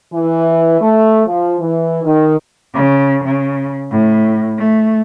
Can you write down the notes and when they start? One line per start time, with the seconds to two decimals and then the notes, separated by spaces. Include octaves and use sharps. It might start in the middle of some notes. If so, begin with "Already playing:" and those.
0.13 E3
0.81 A3
1.27 F3
1.60 E3
2.04 D#3
2.74 C#3
3.24 C#3
3.91 A2
4.58 A3